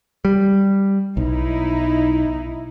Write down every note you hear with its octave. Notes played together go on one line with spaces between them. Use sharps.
G3
B1 D#4 E4